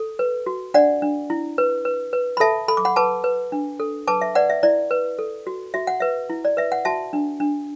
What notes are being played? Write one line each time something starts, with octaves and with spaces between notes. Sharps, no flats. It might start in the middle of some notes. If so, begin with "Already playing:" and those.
Already playing: A4
B4
F#4
D4 D5 F#5
D4
E4
B4
B4
B4
B5
A4 E5 A5
A4 B5
D6
F#5 B5
B4 A5 D6
B4
D4
A4
B4 A5 D6
E5
B4 D5 F#5
E5
E4 D5
B4
A4
F#4
F#4 E5
F#5
B4 E5
E4
D5
B4 E5
F#5
F#4 E5 A5
D4
D4